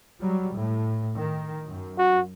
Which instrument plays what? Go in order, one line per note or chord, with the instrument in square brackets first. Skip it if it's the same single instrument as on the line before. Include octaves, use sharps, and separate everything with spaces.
[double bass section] F#3 G3
A2
D#3
F#2
[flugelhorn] F#4